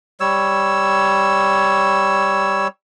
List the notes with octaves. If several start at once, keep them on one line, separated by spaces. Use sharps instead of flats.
G3 C#5 E6